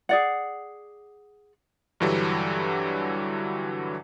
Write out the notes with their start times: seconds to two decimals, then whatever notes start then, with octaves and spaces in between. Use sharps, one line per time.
0.09 G#4 D5 F#5
2.00 G2 D3 E3 F#3 G3